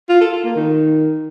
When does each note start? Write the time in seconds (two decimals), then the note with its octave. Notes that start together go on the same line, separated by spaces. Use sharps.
0.09 F4
0.21 A4
0.33 F4
0.44 A#3
0.56 D#3